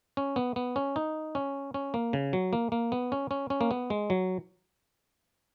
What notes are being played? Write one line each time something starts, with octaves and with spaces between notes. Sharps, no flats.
C#4
B3
B3
C#4
D#4
C#4
C#4
A#3
C#3
F#3
A#3
A#3
B3
C#4
C#4
C#4
A#3
B3
G#3
F#3